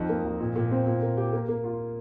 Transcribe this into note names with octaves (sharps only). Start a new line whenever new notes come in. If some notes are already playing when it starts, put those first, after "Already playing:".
Already playing: F2 D#4
A#3
F2
A#2
A#2
C4
A#2
A#3
G4
A#3
A#3
F4